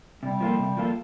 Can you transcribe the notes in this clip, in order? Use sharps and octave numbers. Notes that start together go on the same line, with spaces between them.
C3 G3
F3 A#3 F4 A4
C3
F3 A#3 F4 A4